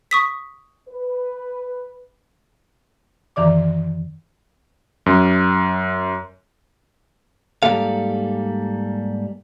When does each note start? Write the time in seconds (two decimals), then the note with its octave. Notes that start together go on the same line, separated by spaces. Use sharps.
0.11 C#6 D#6 B6
0.89 B4
3.36 F#2 D#3 E3 D5 D6
5.06 F#2
7.63 G#2 C#3 G3 A#3 A4 F5